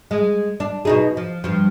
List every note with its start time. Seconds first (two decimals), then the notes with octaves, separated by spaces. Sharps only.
0.11 G#3
0.60 D4
0.85 B2 D#4 G#4
1.17 F3
1.44 G2 F3